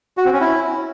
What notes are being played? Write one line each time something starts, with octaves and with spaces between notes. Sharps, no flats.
F#4
C4
C#4
E4